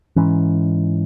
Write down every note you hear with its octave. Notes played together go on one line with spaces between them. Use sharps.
G#2 E3 C#4